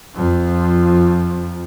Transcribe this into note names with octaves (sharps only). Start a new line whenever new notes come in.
F2 F3